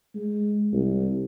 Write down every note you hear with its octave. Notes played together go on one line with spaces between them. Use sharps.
G#3
C2